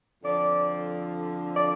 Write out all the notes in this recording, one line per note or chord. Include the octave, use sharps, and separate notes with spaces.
F2 D3 F3 D5
D5